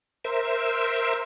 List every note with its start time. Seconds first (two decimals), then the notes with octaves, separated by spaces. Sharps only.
0.24 A#4 C5 E5